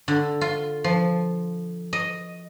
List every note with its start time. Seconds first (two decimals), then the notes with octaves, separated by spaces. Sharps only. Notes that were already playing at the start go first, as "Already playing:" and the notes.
0.08 D3
0.41 F4
0.84 F3
1.93 D#5